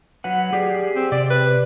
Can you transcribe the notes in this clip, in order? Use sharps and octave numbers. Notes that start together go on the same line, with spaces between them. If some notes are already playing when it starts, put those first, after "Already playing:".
F#3 B4 F#5
G4 G#4 D5
C4
C3 G4 D5
B4